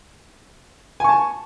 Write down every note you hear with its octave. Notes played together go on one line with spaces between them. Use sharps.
G#5 A5 C#6